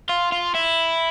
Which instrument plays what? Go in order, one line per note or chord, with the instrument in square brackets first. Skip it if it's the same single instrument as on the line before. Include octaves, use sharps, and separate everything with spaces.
[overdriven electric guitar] F4
F4
E4